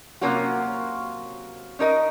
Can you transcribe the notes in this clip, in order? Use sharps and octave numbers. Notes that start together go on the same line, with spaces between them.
C3 F#3 A#3 C#4 F4 F#4
C#4 D#4 A#4 D#5